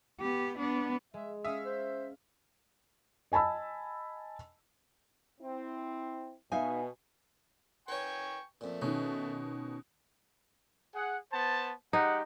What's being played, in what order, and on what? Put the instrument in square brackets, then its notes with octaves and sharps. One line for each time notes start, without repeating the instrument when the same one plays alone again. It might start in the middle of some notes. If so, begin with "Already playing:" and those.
[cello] B3 G4
B3 D4
[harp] G#3 [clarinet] E5
[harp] C#4 F5 [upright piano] E5 [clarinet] D#6
[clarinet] C5
[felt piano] D#5 G#5 A5 B5 E6
[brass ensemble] C4 E4
[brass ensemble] B2 B3 [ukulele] D#4 E5 F5 [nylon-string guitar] G#5
[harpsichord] B4 C#5 [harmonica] G5 G#5 C#6
[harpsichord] F2 A#2 [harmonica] A3
[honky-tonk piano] B2 D#3 [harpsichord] C#4
[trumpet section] G#4 F#5
B3 C5 A5
[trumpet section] G#3 G4 F#5 [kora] D#4